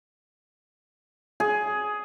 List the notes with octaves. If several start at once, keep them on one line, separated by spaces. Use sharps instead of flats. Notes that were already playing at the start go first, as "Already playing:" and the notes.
G#4